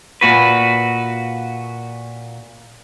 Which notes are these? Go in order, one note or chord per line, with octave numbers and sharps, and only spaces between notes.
A#2 F#4 B4